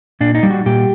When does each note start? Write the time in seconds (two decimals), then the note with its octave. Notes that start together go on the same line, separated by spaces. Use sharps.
0.20 A#2 D4
0.35 D#4
0.43 G3
0.50 F#4
0.66 A#2 G4